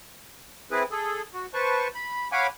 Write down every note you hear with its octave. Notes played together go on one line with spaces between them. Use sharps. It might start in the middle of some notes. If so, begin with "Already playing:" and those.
C4 E4 G#4 B4
G#4 A4
F#4
B4 C5 A5 C#6
B5
C#5 F5 F#5 G#5 B5 D6